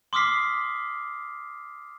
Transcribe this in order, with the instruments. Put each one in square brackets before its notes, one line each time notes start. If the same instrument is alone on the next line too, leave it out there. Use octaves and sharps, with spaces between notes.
[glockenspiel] C6 D6 D#6 F6 B6 C7